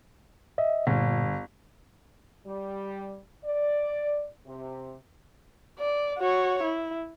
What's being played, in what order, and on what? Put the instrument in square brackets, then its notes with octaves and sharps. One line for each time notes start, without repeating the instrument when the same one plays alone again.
[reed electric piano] D#5 E5
[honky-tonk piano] G1 [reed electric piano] A#2
[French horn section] G3
D5
C3
[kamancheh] D5
F#4 C#5
E4